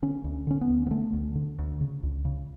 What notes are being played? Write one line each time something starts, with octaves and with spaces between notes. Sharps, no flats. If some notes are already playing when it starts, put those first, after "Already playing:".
D3 C#4
D2
D3 C#4
B3
D2
B3
D3 A3
D2
D3
D2
C#3
C#2
C#3